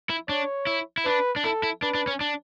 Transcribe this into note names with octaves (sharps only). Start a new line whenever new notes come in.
E4
D4 C#5
E4
E4
D4 B4
D4
E4 A4
E4
D4 B4
D4
C#4
D4